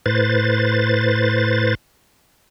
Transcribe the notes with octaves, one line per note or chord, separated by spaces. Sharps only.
A2 B4 C5 A6